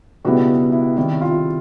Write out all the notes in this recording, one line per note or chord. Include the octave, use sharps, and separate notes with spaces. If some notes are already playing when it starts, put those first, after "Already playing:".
C#2 B2 G3 B3 E4 F#4
E4
C3 D#3 G3 E4
F4